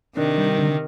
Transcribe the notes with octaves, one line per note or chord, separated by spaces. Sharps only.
C3 D#3 D4
G3
D3